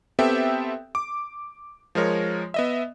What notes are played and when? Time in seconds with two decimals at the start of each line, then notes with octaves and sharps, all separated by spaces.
0.19 B3 C4 G4 A4 E5 G5
0.95 D6
1.95 F3 G#3 A#4 C#5
2.54 B3 D#5 E5